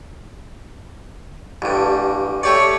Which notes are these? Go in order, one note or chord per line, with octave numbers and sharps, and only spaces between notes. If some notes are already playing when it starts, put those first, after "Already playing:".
A1 G2
A3 G4 C#5 D5